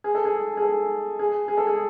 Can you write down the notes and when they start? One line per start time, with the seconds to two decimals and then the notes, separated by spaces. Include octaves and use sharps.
0.04 G#4
0.15 A4
0.25 G#4
0.57 G#4
0.62 A4
1.19 G#4
1.48 G#4
1.57 A4
1.67 G#4